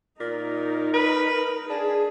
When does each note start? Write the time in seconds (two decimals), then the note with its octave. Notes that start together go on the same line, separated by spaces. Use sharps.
0.20 A#2 D#4 A#4
0.94 B4
1.70 D4 G#4